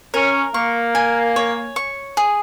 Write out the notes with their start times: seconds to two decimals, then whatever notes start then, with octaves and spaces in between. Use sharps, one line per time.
0.14 C#4 A#4
0.54 A#3 C#6
0.95 G#5
1.36 C#5
1.76 C#6
2.17 G#4